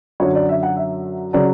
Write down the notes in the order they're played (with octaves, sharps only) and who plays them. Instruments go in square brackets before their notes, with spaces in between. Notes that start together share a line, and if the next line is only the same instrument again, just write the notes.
[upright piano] F#2 D3 F#3 C#5
D5
E5
F#5
E5
C#3 F#3 D5